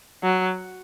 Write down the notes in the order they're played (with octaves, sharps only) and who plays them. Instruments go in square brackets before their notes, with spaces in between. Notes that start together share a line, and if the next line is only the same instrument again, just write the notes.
[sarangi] F#3